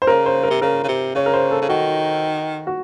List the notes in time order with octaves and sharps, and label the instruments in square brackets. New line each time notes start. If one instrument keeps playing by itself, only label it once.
[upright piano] C5
[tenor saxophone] C#3 [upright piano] A#4
[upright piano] C5
A#4
[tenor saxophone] C3
[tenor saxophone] C#3 [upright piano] A#4
[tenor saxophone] C#3
C3
[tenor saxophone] C#3 [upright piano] C#5
[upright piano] A#4
C5
A4
[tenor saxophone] C#3
[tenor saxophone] D#3 [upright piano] F#4
[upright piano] F#4